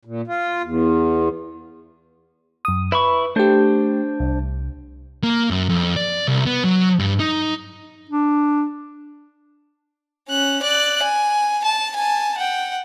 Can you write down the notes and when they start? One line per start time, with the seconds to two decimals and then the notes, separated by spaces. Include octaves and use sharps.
0.05 A#2
0.27 F4
0.64 E2
2.65 F#2 D#6
2.92 E4 B4 B5 C#6
3.36 A3 D4 G4 C5
4.20 C2
5.24 A#3
5.51 F#2
5.69 F2
5.96 D5
6.28 C2
6.46 B3
6.64 F#3
6.99 G2
7.20 D#4
8.09 D4
10.28 C#4 F#6
10.62 D5 F#6
11.02 G#5
11.64 A5
11.96 G#5 A5
12.38 F#5 G5